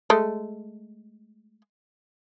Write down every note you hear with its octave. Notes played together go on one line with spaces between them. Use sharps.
G#3 A3